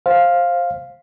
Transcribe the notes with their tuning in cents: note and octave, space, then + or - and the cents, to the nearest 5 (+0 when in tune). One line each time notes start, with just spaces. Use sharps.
C5 +15 F5 +0